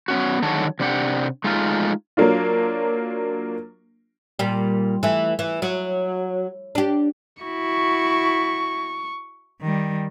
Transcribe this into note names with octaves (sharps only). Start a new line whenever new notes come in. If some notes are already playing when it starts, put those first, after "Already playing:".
B3 C#4 F#4
D3 D#3 F#3 F#4 G#4 A5
C3 D4 G4 F#5
G#3 A3 D#4 F4
F#3 A#3 D4 F4
A#2 G3
E3 A3
E3
F#3
D4 G4
E4 F#4 C#6
D#3 G3